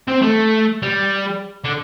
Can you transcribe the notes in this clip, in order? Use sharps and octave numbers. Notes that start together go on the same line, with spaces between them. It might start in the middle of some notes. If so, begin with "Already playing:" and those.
C4
A3
G3
D3